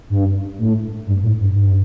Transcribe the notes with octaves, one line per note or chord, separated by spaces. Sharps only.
G2
A2
G2
A2
G2
G2